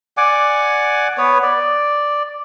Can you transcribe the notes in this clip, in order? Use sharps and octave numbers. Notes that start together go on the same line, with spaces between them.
D5 F#5 G#5 D6
B3 B4 C#5
D5